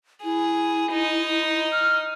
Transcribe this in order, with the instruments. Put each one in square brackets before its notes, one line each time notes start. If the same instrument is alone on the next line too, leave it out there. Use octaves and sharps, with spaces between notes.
[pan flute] E4 [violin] G#4
[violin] D#4
[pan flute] F6